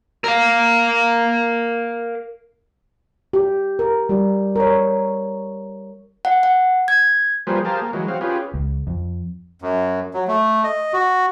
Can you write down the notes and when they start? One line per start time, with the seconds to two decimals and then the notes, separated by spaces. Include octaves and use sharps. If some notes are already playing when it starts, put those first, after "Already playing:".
0.24 A#4 F5
3.33 G4
3.79 A#4
4.09 G3 G4
4.56 A#4 C#5
6.25 F#5
6.43 F#5
6.88 G#6
7.47 F3 G3 A#3 G#4 B4 C5
7.65 G4 G#4 A#4 C5 F5 A5
7.82 A#3
7.93 E3 F#3 G#3
8.08 C4 F#4 F5
8.21 C#4 F4 G4 G#4 B4
8.54 C#2
8.87 F2
9.62 F#2
10.14 F#3
10.28 A3
10.64 D#5
10.93 F#4